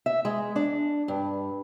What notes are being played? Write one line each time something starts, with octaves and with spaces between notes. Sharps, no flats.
E5
G#3
D4
G2